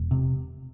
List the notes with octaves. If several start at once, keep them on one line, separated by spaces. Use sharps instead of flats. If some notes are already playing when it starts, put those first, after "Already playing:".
Already playing: E1
C3